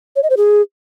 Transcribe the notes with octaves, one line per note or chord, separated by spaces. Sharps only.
C#5
D#5
C5
G#4